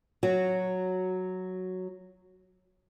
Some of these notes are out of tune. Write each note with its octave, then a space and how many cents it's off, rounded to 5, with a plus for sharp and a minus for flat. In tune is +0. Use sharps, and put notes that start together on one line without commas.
F#3 +0 F#4 -5